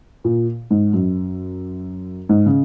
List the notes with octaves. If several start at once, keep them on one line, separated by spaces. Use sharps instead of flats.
A#2
G#2
F#2
G#2
C#3